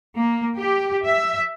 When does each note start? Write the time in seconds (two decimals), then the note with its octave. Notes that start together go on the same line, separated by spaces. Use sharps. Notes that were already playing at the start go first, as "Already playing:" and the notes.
0.19 A#3
0.57 G4
1.04 E5